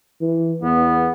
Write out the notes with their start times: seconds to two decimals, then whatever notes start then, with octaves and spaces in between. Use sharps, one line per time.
0.21 E3
0.62 E2 B3